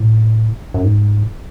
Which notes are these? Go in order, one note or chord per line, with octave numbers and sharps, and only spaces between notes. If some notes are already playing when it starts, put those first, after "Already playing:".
Already playing: A2
F#2
G#2